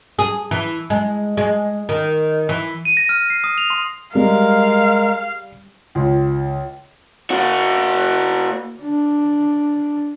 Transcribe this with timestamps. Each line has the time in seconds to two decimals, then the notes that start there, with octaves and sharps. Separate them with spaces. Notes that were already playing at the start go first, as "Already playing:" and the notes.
0.19 G#4
0.51 E3
0.90 G#3
1.37 G#3
1.89 D#3
2.49 E3
2.85 D#7
2.97 A#6
3.09 F6
3.30 C7
3.44 D#6
3.58 F7
3.70 C6
4.15 G3 G#3 A#4 F5
5.95 C#2
7.31 A#3 F#4
8.81 D4